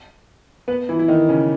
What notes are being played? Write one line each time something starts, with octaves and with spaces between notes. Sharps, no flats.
B3 B4
E3 E4
E4
D#3 D#4
C#3 C#4